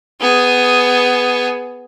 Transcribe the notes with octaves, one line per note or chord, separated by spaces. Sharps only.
B3 G#4